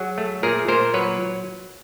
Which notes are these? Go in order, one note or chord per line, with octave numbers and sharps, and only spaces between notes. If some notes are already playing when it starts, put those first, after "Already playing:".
Already playing: F#3 F#4 G#4
A3
A#2 G#4 A#4
A#2 A#4 C5
F#3 B4 C#5